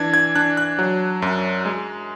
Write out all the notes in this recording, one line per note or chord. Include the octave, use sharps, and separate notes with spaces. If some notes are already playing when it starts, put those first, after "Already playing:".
Already playing: E3 D4 G#6
G#6
D4 F#6
F#6
F#3
F#2
G#3